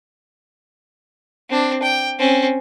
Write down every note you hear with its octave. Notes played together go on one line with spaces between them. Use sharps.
C4 D4
G5
C4 C#4